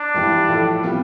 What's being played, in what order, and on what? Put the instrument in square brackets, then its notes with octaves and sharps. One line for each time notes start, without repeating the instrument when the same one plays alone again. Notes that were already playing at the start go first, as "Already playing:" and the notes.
Already playing: [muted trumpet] D4
[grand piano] G2 E3 G3
A2 F3 A3
C3 G3 B3 F4